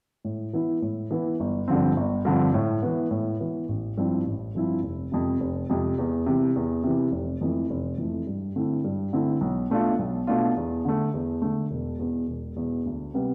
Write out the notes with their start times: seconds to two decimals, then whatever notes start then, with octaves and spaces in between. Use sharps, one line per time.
0.24 A2
0.53 E3 B3 E4
0.82 A2
1.11 E3 B3 E4
1.40 G1
1.68 G2 D3 F3 C4
1.96 G1
2.25 G2 D3 F3 C4
2.54 A2
2.82 E3 B3
3.11 A2
3.40 E3 B3
3.69 A1
3.97 G2 F3 C4 E4
4.26 A1
4.55 G2 F3 C4 E4
4.83 F1
5.12 F2 C3
5.40 F1
5.70 F2 C3
5.98 E2
6.26 C3 E3
6.56 E2
6.84 C3 E3
7.12 F1
7.41 F2 E3 A3
7.70 F1
7.98 F2 E3 A3
8.27 G2
8.56 D3 A3 C4 E4
8.84 G2
9.13 D3 A3 C4 E4
9.41 B1
9.70 B2 A3 D4 F4
9.99 B1
10.27 B2 A3 D4 F4
10.56 E2
10.85 D3 A3
11.14 E2
11.42 D3 A3
11.71 E1
11.99 E2 B2
12.28 E1
12.56 E2 B2
12.85 D2
13.14 C3 G3 B3